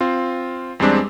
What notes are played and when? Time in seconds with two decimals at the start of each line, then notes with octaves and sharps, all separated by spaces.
0.01 C4 F4
0.80 E2 G3 G#3 C4 D4